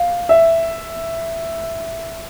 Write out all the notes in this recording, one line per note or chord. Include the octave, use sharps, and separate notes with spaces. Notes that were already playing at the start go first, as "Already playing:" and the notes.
Already playing: F5
E5